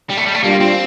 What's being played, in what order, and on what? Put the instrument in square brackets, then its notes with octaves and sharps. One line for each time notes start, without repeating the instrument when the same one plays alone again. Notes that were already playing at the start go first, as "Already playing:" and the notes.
[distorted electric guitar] G3
A3
G3
A3
[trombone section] G3 D4 F4 [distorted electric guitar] A#3
[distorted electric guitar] C4